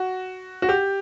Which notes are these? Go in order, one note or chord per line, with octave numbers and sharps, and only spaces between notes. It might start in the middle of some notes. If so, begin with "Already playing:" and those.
Already playing: F#4
F#4
G4